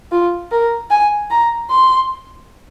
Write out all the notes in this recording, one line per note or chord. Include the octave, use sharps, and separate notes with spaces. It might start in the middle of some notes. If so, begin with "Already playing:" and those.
F4
A#4
G#5
A#5
C6